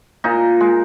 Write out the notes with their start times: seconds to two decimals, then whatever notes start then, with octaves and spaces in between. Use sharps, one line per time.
0.24 A#2 D#4
0.60 G#3